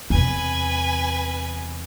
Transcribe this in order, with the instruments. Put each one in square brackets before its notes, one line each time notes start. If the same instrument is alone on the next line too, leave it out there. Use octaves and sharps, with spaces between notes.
[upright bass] E2 C3 [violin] B4 G#5